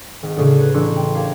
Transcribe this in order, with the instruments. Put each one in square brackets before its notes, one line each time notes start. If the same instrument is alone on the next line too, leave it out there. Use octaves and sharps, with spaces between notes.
[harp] G#1
D2 A2 C#3
B4 C#5 D#7
A1 A3 D4 C6 C#6 E6
G5
G4 A#4 C#5 F5